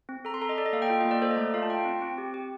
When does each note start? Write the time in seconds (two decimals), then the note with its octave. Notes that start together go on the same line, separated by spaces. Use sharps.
0.09 C4
0.25 A4 A#5
0.34 C6
0.42 A4 A#5
0.49 D#5
0.58 A4 D5
0.66 D#5
0.73 A#3 F5
0.82 G5
0.90 F4
1.00 A#3 D#5
1.11 D5
1.22 A4 C5
1.31 D#5
1.37 A3 D5
1.54 F4 F5
1.63 A5
1.69 F4 G5
1.85 C4
2.02 C4
2.18 G4
2.34 G4